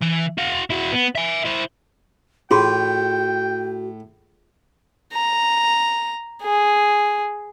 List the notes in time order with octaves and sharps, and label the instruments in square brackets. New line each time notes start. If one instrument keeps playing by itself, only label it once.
[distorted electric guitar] E3
F#4 F5
E4 F#4
B3
E5 G#5
E4 C5
[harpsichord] A2 [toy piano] F4 G#4 C6 [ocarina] F#4 [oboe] G5
[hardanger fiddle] A#5
G#4